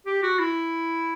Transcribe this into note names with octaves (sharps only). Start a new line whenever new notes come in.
G4
F#4
E4